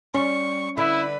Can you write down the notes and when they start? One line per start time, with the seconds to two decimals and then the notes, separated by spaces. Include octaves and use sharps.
0.15 G3 C#4 C#6
0.78 D3 E4 B4